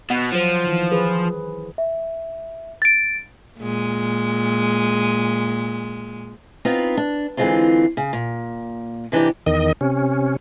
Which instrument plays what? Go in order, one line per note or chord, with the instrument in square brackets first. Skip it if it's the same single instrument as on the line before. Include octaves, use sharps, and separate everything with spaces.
[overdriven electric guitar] B2 [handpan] F#5
[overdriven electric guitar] F3 [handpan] F#3 C5
[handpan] D#3 E3
G#4 B4
[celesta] E5
A6 D7
[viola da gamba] A#2 G#3
[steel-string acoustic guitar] B3 C4 D#4 F4
D4
D3 E3 F#3 G#3 C4 F4
C#3
A#2
C3 E3 D4 D#4 G4
[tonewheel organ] E2 D#3 D#5
C3 C#4